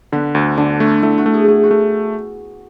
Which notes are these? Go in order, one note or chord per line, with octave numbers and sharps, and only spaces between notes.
D3 B3
D2
D3 D4
A3
A3 E4
F#4
A3
G#4
A3 G#4
F#4
A3